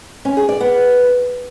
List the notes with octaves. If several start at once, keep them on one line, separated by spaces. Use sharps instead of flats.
C#4
G#4
D5
B3